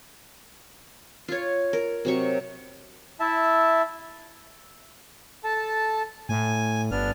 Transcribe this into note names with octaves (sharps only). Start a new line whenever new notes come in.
F4 C#5
A#4
C3 F#3 C#6
E4 E5 A5
A4 A5
A2 G#5
G1 B3 D4 F6